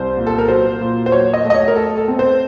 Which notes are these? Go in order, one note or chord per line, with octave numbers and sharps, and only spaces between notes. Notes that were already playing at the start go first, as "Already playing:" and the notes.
Already playing: C2 C5
A#2
A4
A#4
F#3 C5
A#2
C5
F#3 C#5
D#5
A3
D#5
C#5
A#4
A3 A4
A4
C4
C5